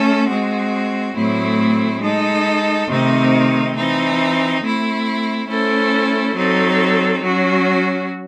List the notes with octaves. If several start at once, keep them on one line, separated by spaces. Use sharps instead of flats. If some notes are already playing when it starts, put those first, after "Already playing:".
Already playing: A3 C#4 A4
G#3 C4 F#4
A2 F#3 A3 C4 E4
G#3 D#4 A4
C3 D#3 A3 C4 D#4
E3 C4 D#4
A3 C4 E4
A3 C#4 E4 A4 C5
F#3 C4 D#4 A4
F#3 C#4 F#4